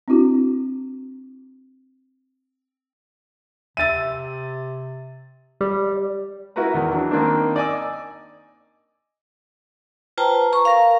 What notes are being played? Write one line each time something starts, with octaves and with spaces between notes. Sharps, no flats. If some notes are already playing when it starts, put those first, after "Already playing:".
C4 D4 E4 F#4
C3 E5 E6 A6 D#7
G3
E4 F#4 A#4 B4 A#5
E2 D#3
E3 F#3 D4
D#3 A#3 C4 D4
D5 D#5 G#5 D6 E6
F4 B4 C5 G5 A5 A#5
A#5 C#6
A#4 F5